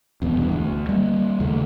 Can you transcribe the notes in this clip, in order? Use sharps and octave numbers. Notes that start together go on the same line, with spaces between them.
D#1 E2 B2
E2 G2
D2
G3 A#3
D#2 C#3 A3